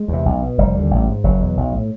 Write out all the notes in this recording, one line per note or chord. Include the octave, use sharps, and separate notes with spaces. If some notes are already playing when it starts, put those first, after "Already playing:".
Already playing: G#3
E2 C3
B1
B2
F1 G3
D#2 D3
A1
G#2
F#1 F#3
E2 B2
B1
A2